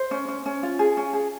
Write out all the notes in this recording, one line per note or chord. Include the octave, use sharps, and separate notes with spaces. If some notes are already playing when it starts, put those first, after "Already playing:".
Already playing: C5
C#4
C#4
C#4
F4
G#4
C#4
G#4